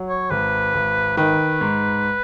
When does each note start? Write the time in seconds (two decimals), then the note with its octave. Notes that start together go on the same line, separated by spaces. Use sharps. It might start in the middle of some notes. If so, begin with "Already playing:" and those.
Already playing: F#3
0.09 C#5
0.30 G#1 B4
0.74 G#1
1.17 D#3 B4
1.61 G#2